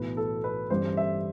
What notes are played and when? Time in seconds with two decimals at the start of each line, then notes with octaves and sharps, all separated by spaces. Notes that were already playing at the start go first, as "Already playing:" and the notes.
Already playing: B1 A2 E3 B4
0.17 A4
0.44 B4
0.70 A1 G2 D3 G3 C5
0.97 E5